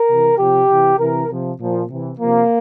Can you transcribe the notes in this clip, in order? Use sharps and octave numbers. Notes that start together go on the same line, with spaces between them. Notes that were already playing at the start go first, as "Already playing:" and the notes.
Already playing: A#4
C3 E3
C3 F3 G4
C3 E3
C3 E3 A#4
C3 F3
A#2 F3
C3 E3
C3 F3 A#3